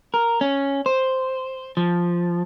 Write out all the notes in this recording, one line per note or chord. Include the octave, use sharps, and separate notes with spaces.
A#4
C#4
C5
F3